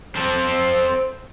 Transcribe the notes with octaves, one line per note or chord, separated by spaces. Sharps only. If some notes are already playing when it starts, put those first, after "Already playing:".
C4 A4 C5